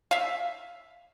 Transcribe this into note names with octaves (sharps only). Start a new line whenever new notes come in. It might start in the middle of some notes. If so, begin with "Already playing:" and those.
E5 F5